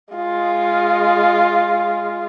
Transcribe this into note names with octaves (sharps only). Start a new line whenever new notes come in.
G#3 F4